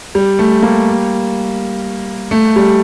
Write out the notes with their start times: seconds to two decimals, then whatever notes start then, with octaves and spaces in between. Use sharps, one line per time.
0.15 G3
0.39 A3
0.62 G3 A#3
2.31 A3
2.56 G3